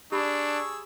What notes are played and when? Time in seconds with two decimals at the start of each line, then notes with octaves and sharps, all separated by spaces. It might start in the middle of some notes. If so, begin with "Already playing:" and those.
0.12 D4 G4 G#4 B5 C#6 E6